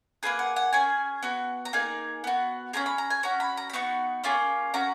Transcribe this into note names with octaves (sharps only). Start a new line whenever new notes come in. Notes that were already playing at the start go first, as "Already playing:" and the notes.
A#3 C#4 G#4 B4
F#5
F#5
C#4 G#4 G#5
B3 F#4
A#5
A#3 D#4 G#4 G#5
B3 F#4
C#4 F4 G#4 A#5
B5
A#5
G#5
C#4 F#4 A#5
B5
A#5
B5
B3 D#4 F#4 C#6
A#3 C#4 F4 G#4
C#4 F#4 A#5